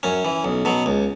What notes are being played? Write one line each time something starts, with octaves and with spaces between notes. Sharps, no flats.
F#2 C#4
E3
B1
B2 F#3
C#2